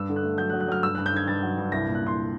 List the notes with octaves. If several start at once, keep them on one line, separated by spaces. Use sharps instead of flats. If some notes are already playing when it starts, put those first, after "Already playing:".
Already playing: G2 E6
D3
F#6
A3
F#3 G6
F#6
F#3
F#6
F#3 F6
G2 E6
G2 F#6
G6
D#3 G#6
G2 A6
F#3
G2
C2 A#6
A#2
F#6
C2 C6